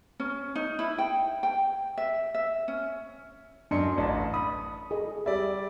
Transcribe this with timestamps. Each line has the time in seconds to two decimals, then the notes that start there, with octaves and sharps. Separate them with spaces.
0.20 C#4
0.55 D#4
0.79 E4
0.98 G5
1.43 G5
1.98 E5
2.35 E5
2.68 C#4
3.71 F#2 D4 D#5 C6 C#7
3.98 A1 D5 D#5 A5
4.34 B5 D#6
4.91 G#4 A4 D#5
5.26 G3 D5 E5